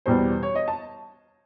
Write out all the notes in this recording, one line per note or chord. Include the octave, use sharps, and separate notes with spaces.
E2 B2 G3 B3 C5
C#5
D#5
A5